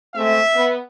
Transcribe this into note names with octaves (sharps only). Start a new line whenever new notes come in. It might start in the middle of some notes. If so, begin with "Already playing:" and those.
G#3 A3 C4 E5
B3